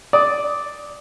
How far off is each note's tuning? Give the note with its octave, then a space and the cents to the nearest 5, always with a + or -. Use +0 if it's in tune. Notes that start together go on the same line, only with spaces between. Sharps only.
D5 +0 D#6 +25